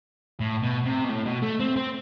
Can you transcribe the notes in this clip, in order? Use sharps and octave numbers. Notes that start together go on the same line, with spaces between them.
A2
B2
C3
B2
A2
B2
A3
C4
C4